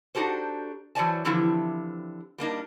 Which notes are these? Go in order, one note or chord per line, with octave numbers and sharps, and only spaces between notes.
D4 D#4 F#4 G4 A4 C5
E3 F#3 C5 D5 G#5 A5
D3 E3 F3 C4 E4 G4
G3 A#3 D4 D#4